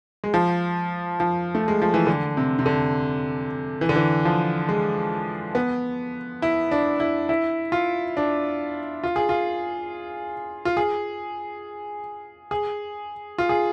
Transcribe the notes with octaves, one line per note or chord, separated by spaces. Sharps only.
G#3
F3
F3
A3
G#3
F3
E3
D3
C3
C3
D3
E3
D3
E3
F3
G#3
B3
E4
D4
E4
E4
F4
D4
F4
G#4
F4
F4
G#4
G#4
F4
G#4